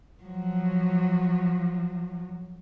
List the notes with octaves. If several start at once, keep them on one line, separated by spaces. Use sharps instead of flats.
F3 F#3